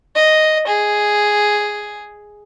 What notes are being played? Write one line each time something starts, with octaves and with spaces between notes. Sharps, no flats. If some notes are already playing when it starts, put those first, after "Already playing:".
D#5
G#4